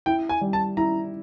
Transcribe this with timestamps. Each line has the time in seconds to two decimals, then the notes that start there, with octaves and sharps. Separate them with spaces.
0.06 E4 G5
0.29 G#5
0.41 G3
0.53 A5
0.77 E4 A#5